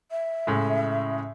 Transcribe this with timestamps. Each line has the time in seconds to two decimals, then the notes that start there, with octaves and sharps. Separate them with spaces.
0.11 E5
0.47 A2 C#3 G#3